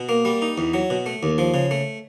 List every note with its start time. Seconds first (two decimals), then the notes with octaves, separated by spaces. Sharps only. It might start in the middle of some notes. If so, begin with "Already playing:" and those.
Already playing: B2
0.09 A#3
0.25 G3
0.42 D#4
0.58 E2
0.74 F#3
0.90 B2
1.06 A3
1.23 D#2
1.38 F3
1.54 C#3
1.71 A3